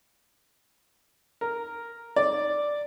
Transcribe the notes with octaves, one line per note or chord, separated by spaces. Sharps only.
A#4
D5